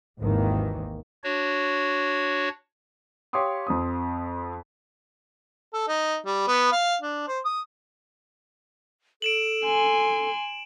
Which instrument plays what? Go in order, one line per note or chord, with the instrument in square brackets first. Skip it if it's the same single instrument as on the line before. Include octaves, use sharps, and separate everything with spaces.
[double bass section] G#1 D#2 D#3 E3 A#3
[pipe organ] D4 F#4 C#5
[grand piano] G4 C#5 F5 C6 D6 D#6
F2 C4 D#6
[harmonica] A4
D#4
G3
B3
F5
D4
C5
D#6
[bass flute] A4 [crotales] D7 E7 F#7
[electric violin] G#5 C6